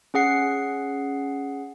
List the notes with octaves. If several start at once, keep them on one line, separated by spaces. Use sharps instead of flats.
C#4 G#4 F#5 C7